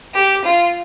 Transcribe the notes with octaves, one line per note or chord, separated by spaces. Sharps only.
G4
F4